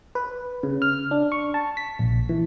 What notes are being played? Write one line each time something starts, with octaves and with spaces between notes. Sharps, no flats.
B4
C#3
F6
D4
C#6
A5
B6
A#1
E3